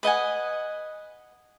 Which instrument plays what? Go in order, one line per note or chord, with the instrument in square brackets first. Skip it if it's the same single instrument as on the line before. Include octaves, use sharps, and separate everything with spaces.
[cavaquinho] B4 D#5 F#5 G#5